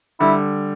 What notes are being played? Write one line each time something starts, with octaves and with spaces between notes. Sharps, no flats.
D3 G3 E4